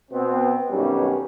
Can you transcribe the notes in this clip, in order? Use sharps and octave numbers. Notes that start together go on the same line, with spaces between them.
B2 B3 C4
B1 G2 D#3 G3 C#4